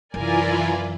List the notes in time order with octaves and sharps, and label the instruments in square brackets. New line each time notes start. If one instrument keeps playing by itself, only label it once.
[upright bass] F#2 C3 [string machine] E3 E4 F4 [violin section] A#4 D5 G#5